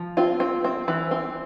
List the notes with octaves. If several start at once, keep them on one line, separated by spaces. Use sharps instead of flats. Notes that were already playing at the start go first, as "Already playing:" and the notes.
Already playing: F3
C4 F4
C4
C4
E3
C4